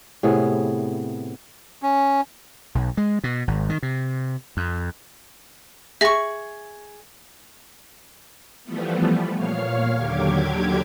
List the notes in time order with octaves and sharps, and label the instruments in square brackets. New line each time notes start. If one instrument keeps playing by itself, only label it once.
[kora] A2 C3 B3 G#4
[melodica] C#4
[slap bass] B1
G#3
B2
G#1
D#3
C3
F2
[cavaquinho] G#4 C#6 [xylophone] E5 A#6
[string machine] E3 F3 G3 A3 B3
A#2 C#5 F5 F6
D#2 D3 F#3 G4 D6 G#6